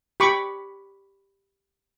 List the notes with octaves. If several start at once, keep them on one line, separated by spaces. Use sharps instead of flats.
G4 B5 C#6 D6